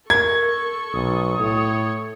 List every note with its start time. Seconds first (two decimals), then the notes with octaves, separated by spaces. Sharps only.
0.10 A4 A#4 C#6 G#6
0.93 B1 D#6
1.39 A2 A4 C#5